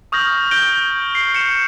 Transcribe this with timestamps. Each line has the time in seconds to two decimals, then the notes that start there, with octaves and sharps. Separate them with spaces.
0.12 C#6 D#6 F6 G6 A#6 F#7
0.51 G6 A#6 D7 G7
1.15 C7
1.35 C#7 E7